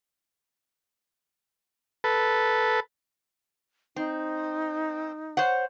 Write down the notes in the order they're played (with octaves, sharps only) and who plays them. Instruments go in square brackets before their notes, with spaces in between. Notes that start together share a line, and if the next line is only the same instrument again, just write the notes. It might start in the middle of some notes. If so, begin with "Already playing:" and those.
[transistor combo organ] A4 B4
[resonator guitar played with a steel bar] C4 [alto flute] D#4
[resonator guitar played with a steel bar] C5 C#5 F#5